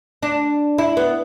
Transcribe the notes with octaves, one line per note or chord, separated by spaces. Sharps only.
D4
E4
B3